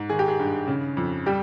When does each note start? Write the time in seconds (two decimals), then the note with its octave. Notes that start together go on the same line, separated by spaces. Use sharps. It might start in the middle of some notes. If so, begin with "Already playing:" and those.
Already playing: G#2
0.09 D#3 G#4
0.19 G4
0.28 G#4
0.39 G2
0.67 C#3
0.97 F2
1.26 G3 G4